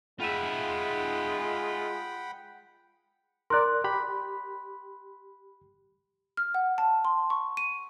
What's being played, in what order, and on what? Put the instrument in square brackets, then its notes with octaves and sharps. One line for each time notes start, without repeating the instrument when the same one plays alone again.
[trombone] G#3 [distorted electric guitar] F4 E5 [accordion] F#5 G5 B5
[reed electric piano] A#4 D5 [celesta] C6 F#6
[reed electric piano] G4 B5
[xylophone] F6
F#5
A5
C6
C#6
D#7